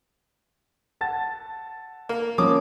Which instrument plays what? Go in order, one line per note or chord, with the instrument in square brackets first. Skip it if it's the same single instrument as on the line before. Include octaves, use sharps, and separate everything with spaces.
[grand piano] F#5 A5 A6
[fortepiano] A#3
[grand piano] F3 A#3 C#4 [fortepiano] D6 D#6